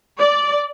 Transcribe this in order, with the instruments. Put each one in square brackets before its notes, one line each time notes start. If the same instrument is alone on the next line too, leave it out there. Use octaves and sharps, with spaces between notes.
[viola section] D5